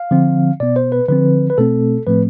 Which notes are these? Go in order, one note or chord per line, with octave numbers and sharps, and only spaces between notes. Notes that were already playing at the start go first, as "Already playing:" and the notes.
Already playing: F5
D3 F3 C4
B2 B3 D5
C5
B4
D3 F3 C4 B4
B4
B2 A3 C4 A4
A2 F3 A3 C4 B4